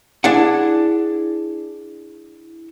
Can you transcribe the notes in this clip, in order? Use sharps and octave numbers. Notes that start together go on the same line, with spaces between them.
D4 E4 G#4 F#5